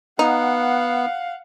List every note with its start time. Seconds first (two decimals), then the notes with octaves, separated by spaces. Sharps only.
0.19 B3 D#4 F5 F#5